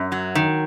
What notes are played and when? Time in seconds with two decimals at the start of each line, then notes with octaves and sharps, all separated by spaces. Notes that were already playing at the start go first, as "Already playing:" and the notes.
Already playing: F#2
0.12 F#3
0.35 D#3